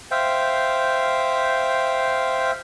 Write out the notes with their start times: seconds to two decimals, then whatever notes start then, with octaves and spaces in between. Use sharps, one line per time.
0.11 C5 E5 F5 G5